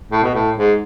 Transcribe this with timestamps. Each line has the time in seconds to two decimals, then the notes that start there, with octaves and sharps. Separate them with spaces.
0.12 A2
0.24 B2
0.34 A2
0.57 G#2